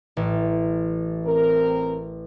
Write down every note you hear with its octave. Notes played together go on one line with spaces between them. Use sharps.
A1
C4 A#4